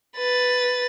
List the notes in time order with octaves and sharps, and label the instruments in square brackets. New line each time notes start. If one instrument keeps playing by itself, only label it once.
[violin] B4 A6